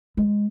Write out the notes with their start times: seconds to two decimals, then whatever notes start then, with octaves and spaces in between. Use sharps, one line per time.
0.17 G#3